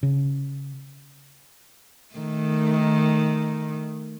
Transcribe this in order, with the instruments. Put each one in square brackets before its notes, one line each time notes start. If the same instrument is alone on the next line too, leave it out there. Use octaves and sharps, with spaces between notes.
[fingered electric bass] C#3
[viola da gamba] D#3 A3